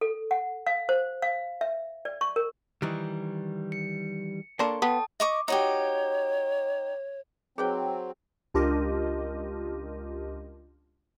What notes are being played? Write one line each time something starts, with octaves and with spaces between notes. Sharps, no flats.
A4
F#5
F5
C5
F5
E5
D5
C#6
A#4
D#3 E3 G3
C#7
A#3 D4 A4 C#5 C6
B3 G5 A5 D#6
D#5 C#6 D6
D#4 F#4 G4 C#5
F#3 C4 D#4 G#4 B4 G5
C#2 D4 F4 G4 A#4 D#5